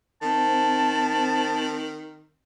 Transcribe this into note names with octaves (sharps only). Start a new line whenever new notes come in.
D#3 C4 A5